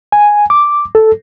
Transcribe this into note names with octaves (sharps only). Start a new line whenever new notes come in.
G#5
D6
A4